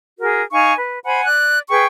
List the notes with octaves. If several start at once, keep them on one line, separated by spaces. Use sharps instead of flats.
F#4 G#4 A#4
D#4 F5 G#5 C#6
B4
C5 F#5 G#5 B5
D5 F#6
G#4 B4 G5 C#6